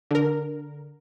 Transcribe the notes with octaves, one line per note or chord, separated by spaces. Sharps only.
D3 A#4